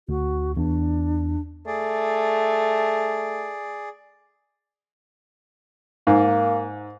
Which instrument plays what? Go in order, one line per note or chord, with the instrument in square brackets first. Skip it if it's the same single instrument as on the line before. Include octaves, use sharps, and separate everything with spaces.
[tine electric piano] D2 [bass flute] F#4
[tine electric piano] E2 [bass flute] D4
[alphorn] A3 [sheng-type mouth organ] G#4 D5
[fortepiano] G#2 [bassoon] A#3